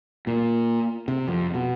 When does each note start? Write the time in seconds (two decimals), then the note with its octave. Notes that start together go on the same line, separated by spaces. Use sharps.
0.27 A#2
1.08 C3
1.28 F2
1.54 B2